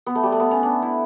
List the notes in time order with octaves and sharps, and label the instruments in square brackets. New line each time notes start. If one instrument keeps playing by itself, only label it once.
[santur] B3
A3
G3
A3
B3
C#4
D4
E4